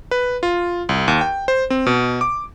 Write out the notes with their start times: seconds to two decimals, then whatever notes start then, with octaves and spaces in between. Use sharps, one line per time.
0.11 B4
0.43 F4
0.89 C2
1.08 D#2
1.21 G5
1.48 C5
1.70 C4
1.86 B2
2.21 D6